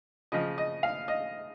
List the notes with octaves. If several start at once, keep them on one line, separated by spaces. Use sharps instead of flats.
C#3 F3 D#5
D#5
F5
D#5